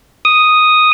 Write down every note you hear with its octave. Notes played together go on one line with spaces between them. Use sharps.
D#6